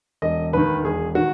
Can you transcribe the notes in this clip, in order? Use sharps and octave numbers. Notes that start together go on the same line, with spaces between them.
E1 D#5
D#2 D#3 B4
E1 G#4
D#3 F#4